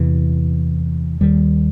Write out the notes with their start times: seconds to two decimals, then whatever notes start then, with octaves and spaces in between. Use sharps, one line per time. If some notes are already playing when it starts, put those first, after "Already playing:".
Already playing: E2 C3 E3
1.21 D#2 D#3 G3